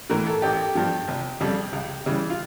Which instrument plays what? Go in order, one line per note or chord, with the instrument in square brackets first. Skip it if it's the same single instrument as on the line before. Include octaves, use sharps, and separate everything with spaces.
[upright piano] A2 E3 A#4
A4
A1 G4
G2 F3
F1
F2 C#3 G3
C#2
C#3 E3 G3
F4